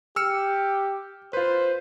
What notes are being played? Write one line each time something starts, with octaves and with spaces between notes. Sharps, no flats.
G4 E6 F6 C#7
F4 B4 C5